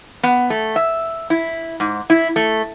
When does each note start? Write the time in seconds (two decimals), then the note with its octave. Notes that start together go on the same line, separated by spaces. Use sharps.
0.23 B3
0.50 A3
0.76 E5
1.30 E4
1.80 G#2
2.10 E4
2.36 A3